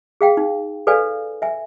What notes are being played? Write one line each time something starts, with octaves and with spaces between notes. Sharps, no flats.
G#4 F5 G5
D#4
A4 B4 D5 F5 G#5
E5 G#5